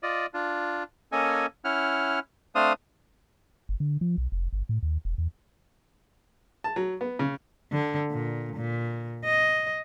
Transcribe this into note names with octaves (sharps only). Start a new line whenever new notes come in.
F4 D5 D#5
D4 F4
A#3 C#4 A4 D#5 G#5
C#4 E4 F#5 F6
A3 C4 D4 C5 F5 D#6
F#1
D3
F3
B1
F1
G1
A2
D#2
E1
E2
A5
F#3
B3
C#3
D3
A#2
A#2
D#5